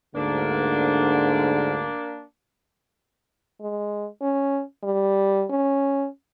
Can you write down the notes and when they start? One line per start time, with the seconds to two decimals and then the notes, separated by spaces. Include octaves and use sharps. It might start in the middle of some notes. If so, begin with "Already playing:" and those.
0.15 D2 G#2 D3 A#3 D4
3.60 G#3
4.22 C#4
4.83 G3
5.50 C#4